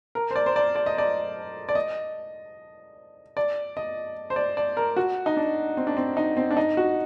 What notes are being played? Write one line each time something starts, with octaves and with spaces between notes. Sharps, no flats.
A#4
C5
D5
C5
D5
D5
D#5
D5
D5
D#5
D5
D#5
C5
D5
D5
A#4
F#4
D#4
D4
C4
D4
C4
D#4
C4
D4
D#4
F#4